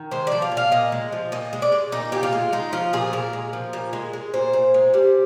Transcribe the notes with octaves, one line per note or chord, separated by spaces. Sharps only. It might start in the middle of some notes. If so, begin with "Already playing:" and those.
Already playing: D#3
G#3 C5
F3 D5
F5
A#2
F5
A#2 D#5
G#3
F3
A#2 D#5
G#3
D5
G#3
A#2 D#4
A#2 G4
F4
G#3
G#3 D#4
F3 F4
A#2 G#4
A#2 A#4
G#3
F3
A#2
G#3
G#3
A#2 C5
A#2
G#3
G3